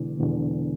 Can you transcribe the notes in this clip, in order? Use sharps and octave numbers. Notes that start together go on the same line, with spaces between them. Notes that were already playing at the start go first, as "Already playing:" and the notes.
Already playing: E1 E2 D3
E1 E2 D3